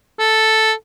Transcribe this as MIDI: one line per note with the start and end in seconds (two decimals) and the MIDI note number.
0.19 0.73 69